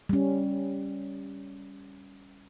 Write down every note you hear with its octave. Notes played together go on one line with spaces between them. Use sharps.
G3 C#4